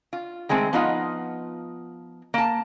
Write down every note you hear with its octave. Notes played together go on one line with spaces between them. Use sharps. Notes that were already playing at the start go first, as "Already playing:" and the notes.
F4
D#3 G#3 A3 C4
F3 B3 D#4 F4 D#5 F#5
A#3 A5